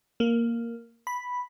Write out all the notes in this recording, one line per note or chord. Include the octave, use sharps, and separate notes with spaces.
A#3
B5